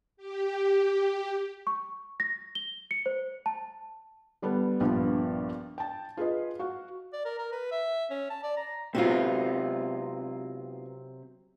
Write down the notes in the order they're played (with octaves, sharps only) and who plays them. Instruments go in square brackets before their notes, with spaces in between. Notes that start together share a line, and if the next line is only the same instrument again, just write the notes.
[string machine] G4
[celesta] C#6
A#6
G7
C#7
C5
A5
[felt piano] D3 G3 B3 D4
A#1 G2 F3 B3
G5 A5
F4 G#4 B4 D#5
F#4 F5 F#5
[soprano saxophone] D5
A#4
A#4
B4
E5
C#4
A5
D5
A#5
[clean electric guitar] C3 F#3 C4 [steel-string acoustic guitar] B3 D#4 F4